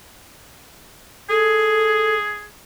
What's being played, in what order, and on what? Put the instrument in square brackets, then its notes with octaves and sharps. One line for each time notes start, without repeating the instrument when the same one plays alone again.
[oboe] G#4 [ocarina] A4